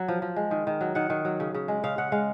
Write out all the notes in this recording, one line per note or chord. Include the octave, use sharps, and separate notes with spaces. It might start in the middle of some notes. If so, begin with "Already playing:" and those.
Already playing: F#3
F3
F3
G#3
D#3
D#3
F#3
D#3 F#5
D#3
F#3
C#3
C#3
G#3
C#3 F5
C#3 F#5
G#3 F5